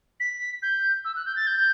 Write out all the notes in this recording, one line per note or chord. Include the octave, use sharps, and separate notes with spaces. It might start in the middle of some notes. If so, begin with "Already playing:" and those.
B6
G6
E6
F#6
G6
A6
G6